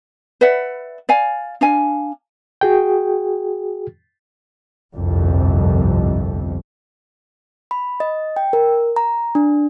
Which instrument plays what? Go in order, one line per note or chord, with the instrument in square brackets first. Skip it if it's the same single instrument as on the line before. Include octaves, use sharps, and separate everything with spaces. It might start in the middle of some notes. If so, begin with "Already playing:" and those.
[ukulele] B4 D5 E5 F#5
D5 F5 G#5
D4 F5 G#5
[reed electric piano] F#4 G#4 G5
[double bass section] G1 C2 F2
[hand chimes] B5
D#5
G5
A#4
A#5
D4